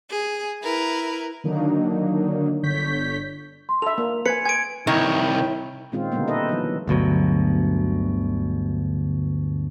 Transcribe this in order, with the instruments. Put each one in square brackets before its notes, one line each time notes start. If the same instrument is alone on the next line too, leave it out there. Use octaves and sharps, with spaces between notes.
[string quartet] G#4
E4 A#4 B4
[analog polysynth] D3 D#3 F#3 A#3 D4 D#4
G1 D3 C#5 G6 B6
[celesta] C6
[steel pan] A4 E5 [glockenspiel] F7
[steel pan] A#3
[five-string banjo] B4 [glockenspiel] G#5 G#6 C#7
[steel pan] G#5 [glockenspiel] G#6 D7
[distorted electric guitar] C2 C#5 [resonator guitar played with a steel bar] D#3 [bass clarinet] E4 [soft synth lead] G5
[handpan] A#2 D#3 G#3 C4 C#4 F4
B2 D3 G3 G#3 A#3 B3
D#4 A4 B4 D#5 E5
E3 F#3
[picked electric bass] G1 D2 B2 F#3